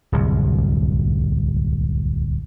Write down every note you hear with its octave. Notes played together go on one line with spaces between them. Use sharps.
D1 C2 F#2